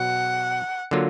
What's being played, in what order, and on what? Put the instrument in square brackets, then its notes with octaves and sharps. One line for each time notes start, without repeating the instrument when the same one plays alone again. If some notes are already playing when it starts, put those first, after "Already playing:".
Already playing: [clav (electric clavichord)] B2 F#3 [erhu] F#5
[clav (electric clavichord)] D3 F#3 A#3 F4